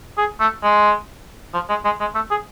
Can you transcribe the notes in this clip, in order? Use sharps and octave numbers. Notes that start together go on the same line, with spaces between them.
G#4
A3
G#3
F3
G#3
G#3
G#3
A3
G#4